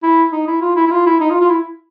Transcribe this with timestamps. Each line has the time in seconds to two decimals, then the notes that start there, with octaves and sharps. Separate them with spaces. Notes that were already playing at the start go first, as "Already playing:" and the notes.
0.03 E4
0.32 D#4
0.47 E4
0.61 F4
0.76 E4
0.87 E4
0.91 F4
1.06 E4
1.20 D#4
1.30 F4
1.41 F4
1.49 E4